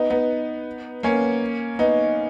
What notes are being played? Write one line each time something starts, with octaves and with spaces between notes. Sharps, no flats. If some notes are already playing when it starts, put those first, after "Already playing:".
Already playing: B3 D#4
B3 D#4
A#3 C#4
B3 D#4